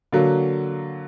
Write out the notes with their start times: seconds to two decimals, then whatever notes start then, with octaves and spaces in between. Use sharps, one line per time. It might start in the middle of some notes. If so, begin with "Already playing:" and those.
0.12 D3 F#3 A#3